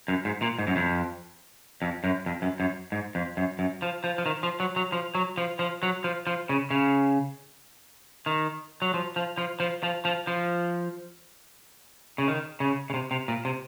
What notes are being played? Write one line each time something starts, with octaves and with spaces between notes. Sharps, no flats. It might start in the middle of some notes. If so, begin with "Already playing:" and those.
F#2
G#2
A#2
G#2
F#2
F2
F2
F#2
F2
F#2
F#2
G#2
F2
F#2
F#2
F3
F3
F3
D#3
F3
F#3
F#3
F3
F#3
F3
F3
F#3
F3
F3
C#3
C#3
D#3
F#3
F3
F3
F3
F3
F3
F3
F3
C#3
D#3
C#3
C#3
C3
C3
A#2
C3